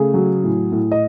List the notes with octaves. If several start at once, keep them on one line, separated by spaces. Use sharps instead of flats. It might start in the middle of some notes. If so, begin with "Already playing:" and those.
Already playing: C#3 A3 G#4
F#3
A2
A2
D#5